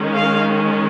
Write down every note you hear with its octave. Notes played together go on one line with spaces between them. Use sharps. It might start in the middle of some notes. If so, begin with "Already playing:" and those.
Already playing: D#3 G#3 C#4
F5